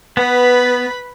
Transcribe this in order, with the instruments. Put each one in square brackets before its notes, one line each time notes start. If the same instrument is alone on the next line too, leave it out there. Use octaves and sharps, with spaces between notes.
[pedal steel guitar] B3 [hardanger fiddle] B4 B5